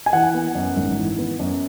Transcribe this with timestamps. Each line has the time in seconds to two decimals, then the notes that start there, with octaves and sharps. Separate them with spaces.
0.06 G#5
0.13 E3 F#5
0.34 B3
0.55 F#2
0.77 G#1
0.97 E3
1.18 B3
1.39 F#2